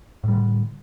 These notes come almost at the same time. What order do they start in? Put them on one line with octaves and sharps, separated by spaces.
A2 G3 D3